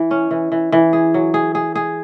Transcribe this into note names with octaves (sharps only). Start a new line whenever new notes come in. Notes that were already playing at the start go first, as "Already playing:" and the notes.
Already playing: E3
C#4
E3
E3
E3
G#4
F#3
G#4
G#4
G#4